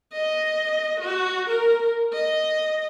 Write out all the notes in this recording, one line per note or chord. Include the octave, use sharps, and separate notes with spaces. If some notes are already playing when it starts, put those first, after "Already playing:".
D#5
F#4
A#4
D#5